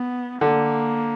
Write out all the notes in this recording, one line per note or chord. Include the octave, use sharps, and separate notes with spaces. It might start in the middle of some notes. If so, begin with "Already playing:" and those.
Already playing: B3
D3 A#3